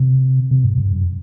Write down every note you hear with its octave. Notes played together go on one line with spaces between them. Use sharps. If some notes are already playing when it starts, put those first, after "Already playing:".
Already playing: C3
C3
G2
G2
F#2